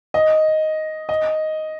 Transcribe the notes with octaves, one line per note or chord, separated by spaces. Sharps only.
D#5
D#5